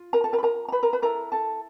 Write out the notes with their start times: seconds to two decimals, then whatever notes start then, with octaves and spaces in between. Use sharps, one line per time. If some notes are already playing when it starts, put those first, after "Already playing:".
Already playing: F4
0.13 A#4 A#5
0.24 A4 A5
0.33 A#4 A#5
0.38 B5
0.43 A#4 A#5
0.68 A#5
0.72 B4 B5
0.83 A#4 A#5
0.93 B4 B5
1.02 E4 A4 A#4 A#5
1.32 A4 A5